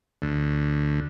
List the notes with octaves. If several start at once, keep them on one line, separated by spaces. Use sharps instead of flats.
D2